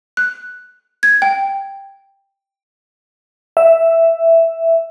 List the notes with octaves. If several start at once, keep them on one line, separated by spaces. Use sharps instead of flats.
F#6
G#6
G5
E5